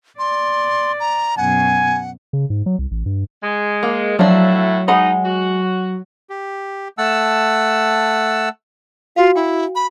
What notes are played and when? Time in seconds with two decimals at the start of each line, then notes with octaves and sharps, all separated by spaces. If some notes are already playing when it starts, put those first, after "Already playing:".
0.19 D5 C6
1.00 A#5
1.38 F#2 B2 F#5 G#5
2.33 C#3
2.50 G#2
2.66 F#3
2.79 C2
2.91 A1
3.06 G2
3.43 G#3
3.83 A#3
4.19 A2 F3 F#3 D4 F#4 E5
4.88 G#3 D#4 F#5 B5
5.25 F#4
6.30 G4
6.98 A3 F#5 A5 E6
9.16 F4 F#4 F5
9.35 E4 G5
9.75 B5